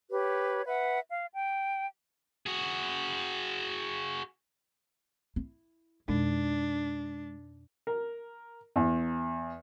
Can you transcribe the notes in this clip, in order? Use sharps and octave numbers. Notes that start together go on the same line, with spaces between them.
G4 B4 C#5
B4 E5 F#5
F5
G5
F#4 G#4
E4
F2 B2 G#3 D4
A#4
E2